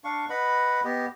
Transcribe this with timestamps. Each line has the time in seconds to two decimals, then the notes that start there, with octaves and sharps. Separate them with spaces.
0.04 D4 F5 C#6
0.30 B4 D#5 F#5 B5
0.84 B3 G4 D#5